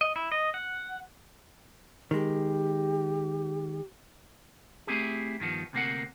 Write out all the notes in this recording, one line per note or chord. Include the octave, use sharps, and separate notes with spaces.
D#5
E4
D#5
F#5
D#3 G#3 G4
A3 C4 E4 G4 G#4
G2 D#3 F3 B3
D2 C3 D#3 A#3 C4 F#5